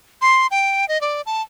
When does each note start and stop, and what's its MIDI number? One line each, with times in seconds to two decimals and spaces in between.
0.22 0.47 84
0.51 0.88 79
0.88 1.01 75
1.01 1.22 74
1.26 1.42 81